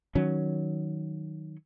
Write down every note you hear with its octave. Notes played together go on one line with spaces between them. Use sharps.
D#3 F#3 C#4